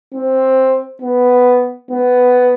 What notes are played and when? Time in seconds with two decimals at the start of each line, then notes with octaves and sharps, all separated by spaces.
0.14 C4
1.02 B3
1.91 B3